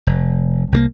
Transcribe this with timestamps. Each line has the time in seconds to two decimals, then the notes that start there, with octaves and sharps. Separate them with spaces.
0.07 F1
0.72 C2 G3 A#3